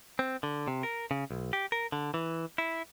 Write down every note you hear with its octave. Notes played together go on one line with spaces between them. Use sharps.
C4
D3
C3
A#4
C#3
B1
G4
A#4
D3
E3
E4